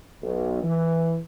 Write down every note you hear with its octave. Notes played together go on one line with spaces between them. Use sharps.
B1
E3